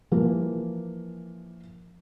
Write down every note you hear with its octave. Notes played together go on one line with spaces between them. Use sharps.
E3 F3 A#3